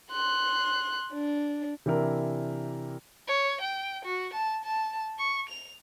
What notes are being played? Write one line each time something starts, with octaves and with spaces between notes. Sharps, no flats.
C6 F#6
D4
C3 E3 D4 E4 A#4
C#5
G5
F#4
A5
A5
C#6
F7